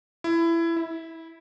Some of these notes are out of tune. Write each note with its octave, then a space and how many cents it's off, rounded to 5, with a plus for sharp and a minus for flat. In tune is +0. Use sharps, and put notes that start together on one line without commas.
E4 +20
E4 -15